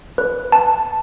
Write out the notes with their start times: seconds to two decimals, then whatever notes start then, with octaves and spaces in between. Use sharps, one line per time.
0.18 B4
0.52 A5